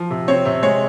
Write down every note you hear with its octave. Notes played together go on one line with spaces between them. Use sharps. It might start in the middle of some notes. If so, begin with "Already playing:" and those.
Already playing: F3
C3
C4 C#5
C3
G#3 C#5